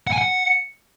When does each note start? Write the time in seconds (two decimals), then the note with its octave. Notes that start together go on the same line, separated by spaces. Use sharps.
0.07 F#5
0.13 G#5
0.18 F#5